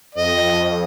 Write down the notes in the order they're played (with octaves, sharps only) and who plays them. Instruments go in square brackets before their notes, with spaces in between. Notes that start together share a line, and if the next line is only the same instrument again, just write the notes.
[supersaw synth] F2 [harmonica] D#5